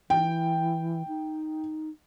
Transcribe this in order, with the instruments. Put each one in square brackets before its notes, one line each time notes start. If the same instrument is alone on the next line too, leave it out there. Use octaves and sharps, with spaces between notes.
[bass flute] E3 [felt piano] G5
[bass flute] D#4